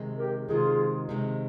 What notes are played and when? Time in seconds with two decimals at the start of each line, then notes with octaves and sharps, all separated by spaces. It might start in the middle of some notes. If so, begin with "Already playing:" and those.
Already playing: C3 D#3 G#3
0.18 G4 A#4
0.48 C3 D#3 G#3 F4 G#4
1.09 C3 D#3 G#3